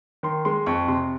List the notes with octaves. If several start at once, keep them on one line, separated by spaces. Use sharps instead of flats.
D#3 C6
G#3 C6
F2 C#6
C3 C6